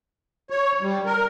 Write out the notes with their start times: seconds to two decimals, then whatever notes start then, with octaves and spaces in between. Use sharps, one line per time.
0.50 C#5
0.81 G3
1.06 A#4